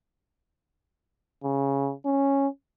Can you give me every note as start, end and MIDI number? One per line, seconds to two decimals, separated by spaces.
1.44 1.93 49
2.06 2.48 61